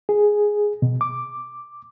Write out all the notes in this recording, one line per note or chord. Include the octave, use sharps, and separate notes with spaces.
G#4
B2
D6